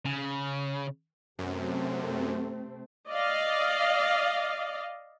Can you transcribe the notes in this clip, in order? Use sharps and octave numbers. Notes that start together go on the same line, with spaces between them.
C#3
F#2 C3 A3 C4
D5 D#5 F5